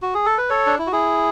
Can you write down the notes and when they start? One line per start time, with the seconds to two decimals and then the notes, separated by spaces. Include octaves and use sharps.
0.02 F#4
0.14 G#4
0.26 A4
0.38 B4
0.50 A4 C#5
0.66 D4
0.79 E4
0.87 F#4
0.92 E4 G#4